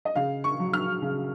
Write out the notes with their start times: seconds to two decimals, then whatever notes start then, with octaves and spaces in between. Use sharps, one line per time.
0.05 D#5
0.16 C#3 F5
0.44 C#6
0.60 F#3
0.73 F6
1.02 C#3